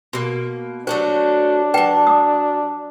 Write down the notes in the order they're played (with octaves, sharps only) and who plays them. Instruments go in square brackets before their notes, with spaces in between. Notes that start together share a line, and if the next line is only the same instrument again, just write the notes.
[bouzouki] B2 A#3 [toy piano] F#4
[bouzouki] F#3 A3 F#4 [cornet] D4 [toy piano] C5
[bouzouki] F#3 A5 [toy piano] B4 F#5 G5
[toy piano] D6 D#6